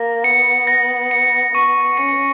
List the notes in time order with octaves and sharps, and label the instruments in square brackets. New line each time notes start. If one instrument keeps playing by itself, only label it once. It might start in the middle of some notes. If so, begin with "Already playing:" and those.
Already playing: [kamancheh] A#3 [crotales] A#6
[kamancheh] B3 [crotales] C#7
[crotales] A#6
C#7
[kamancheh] B3 [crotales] C#6
[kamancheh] C#4 [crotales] C#7